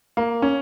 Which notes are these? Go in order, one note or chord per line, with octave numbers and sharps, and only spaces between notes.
A#3
C#4